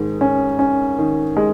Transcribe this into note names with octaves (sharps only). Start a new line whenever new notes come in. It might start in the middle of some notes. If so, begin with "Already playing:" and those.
Already playing: G#2 D#3
C#4
C#4
D#3
G#3